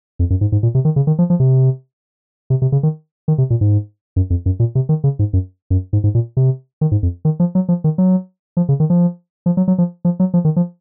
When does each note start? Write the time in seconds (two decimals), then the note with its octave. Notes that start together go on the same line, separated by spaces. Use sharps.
0.19 F2
0.30 F#2
0.41 G#2
0.52 G#2
0.63 A#2
0.75 C3
0.85 D#3
0.96 C#3
1.07 D#3
1.19 F3
1.30 F3
1.40 C3
2.50 C3
2.62 C3
2.72 C#3
2.83 D#3
3.28 D#3
3.38 C3
3.50 A#2
3.61 G#2
4.16 F#2
4.30 F2
4.46 F#2
4.60 A#2
4.75 C3
4.89 D#3
5.04 C#3
5.19 G#2
5.33 F#2
5.70 F#2
5.93 G#2
6.04 G#2
6.15 A#2
6.37 C3
6.81 D#3
6.92 G#2
7.03 F2
7.25 D#3
7.40 F3
7.55 F#3
7.69 F3
7.84 D#3
7.98 F#3
8.57 F3
8.69 C#3
8.80 D#3
8.90 F3
9.46 F3
9.57 F#3
9.68 F#3
9.78 F3
10.05 F3
10.20 F#3
10.34 F3
10.45 D#3
10.56 F3